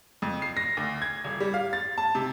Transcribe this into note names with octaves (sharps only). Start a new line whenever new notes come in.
F2
C7
A#6
D2
G#6
D#1
G3
F5
A6
A5
C3